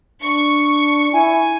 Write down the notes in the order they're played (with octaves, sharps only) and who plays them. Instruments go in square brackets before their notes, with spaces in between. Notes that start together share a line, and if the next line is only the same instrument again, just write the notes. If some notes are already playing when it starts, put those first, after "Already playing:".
[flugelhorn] D4 [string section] C#6
[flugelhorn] E4 [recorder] G#5